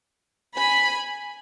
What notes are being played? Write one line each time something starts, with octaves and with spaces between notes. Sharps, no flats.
G#5 B5